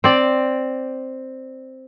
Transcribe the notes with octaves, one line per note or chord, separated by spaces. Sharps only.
C4 D5